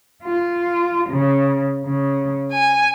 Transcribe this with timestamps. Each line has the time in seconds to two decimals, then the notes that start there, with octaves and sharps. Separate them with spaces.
0.23 F4
1.09 C#3
1.84 C#3
2.51 G#5